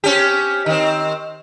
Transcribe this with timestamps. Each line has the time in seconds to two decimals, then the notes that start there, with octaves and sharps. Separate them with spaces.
0.04 C4 C#4 G4
0.66 D#3 C4